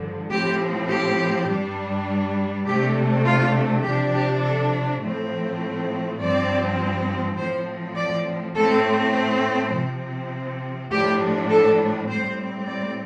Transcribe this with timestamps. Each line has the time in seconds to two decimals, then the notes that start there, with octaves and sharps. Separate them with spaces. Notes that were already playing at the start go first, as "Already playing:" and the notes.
Already playing: G2 D3 F3
0.30 A2 F3 C4 G4
0.89 G4
1.48 G2 G3 D4
2.65 C3 A3 D4 G4
3.25 F4
3.83 C3 F3 D4 G4
4.13 G4
4.42 A4
5.02 A2 F3 A3 C4
6.18 G2 F3 C4 D5
7.36 A2 F3 C4 C5
7.95 D5
8.55 A2 A3 C4 A4
9.13 C5
9.73 C3 F3 C4
10.90 A2 F3 D4 G4
11.49 A4
12.08 A2 G3 C4 C5
12.67 D5